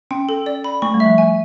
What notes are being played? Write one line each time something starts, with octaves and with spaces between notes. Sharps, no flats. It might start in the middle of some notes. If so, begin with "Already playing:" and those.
C#4 G5
A4
D5
B5
A3 C#6
G3
E5
F3
G#5